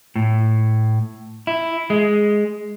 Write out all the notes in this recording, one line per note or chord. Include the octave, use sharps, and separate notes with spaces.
A2
E4
G#3